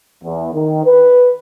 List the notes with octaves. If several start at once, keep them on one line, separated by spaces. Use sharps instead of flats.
E2
D#3
B4